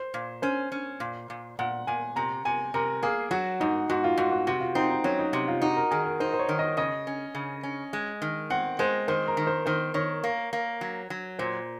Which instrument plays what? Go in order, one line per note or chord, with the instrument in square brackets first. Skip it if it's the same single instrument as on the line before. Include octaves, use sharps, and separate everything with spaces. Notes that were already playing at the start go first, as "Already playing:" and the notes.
Already playing: [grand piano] C5
[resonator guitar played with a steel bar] A#2
[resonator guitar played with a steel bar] C#4 [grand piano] C5
[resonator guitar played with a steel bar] C#4
A#2
A#2
[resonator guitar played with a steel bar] A#2 [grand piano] F#5
[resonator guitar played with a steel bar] A#2 [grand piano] G#5
[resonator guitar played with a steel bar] C3 [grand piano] A#5
[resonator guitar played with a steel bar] C3 [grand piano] G#5
[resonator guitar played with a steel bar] C3 [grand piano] A#4
[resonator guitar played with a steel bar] A#3 [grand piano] G#4
[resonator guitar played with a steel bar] F#3 [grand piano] F#4
[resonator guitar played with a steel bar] G#2 [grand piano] D#4
[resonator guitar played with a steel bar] G#2 [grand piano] F#4
[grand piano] F4
[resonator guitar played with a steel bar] G#2 [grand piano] F#4
[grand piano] F#4
[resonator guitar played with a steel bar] C3 [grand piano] F#4
[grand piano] F4
[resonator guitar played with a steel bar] C4 [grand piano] D#4
[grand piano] D#4
[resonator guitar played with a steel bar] F#3 [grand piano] C#4
[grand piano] D#4
[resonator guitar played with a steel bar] C3
[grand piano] F4
[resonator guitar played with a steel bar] D#4 [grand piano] F#4
[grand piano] A#4
[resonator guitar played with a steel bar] D#3 [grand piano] G#4
[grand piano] A#4
[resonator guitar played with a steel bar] D#4 [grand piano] C5
[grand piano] C5
C#5
[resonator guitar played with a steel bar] D#3
[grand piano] D#5
[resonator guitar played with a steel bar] C#3 [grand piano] D#5
[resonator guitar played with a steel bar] C#4
C#3
C#4
G#3
D#3
[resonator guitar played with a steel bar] C4 [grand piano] F#5
[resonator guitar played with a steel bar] G#3 [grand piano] C5
[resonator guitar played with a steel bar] D#3 [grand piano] C5
[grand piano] A#4
[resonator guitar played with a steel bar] D#3
[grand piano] C5
[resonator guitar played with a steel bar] D#3 [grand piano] C5
[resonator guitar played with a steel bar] D#3 [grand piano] C#5
[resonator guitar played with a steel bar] A#3
A#3
F#3
F#3
[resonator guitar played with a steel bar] A#2 [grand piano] C5